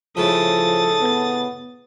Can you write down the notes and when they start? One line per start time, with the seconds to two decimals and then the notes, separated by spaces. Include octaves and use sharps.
0.17 A2 C#3 F3 A4 D#6 A6
1.02 B3